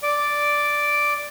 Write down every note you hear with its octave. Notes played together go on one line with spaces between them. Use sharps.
D5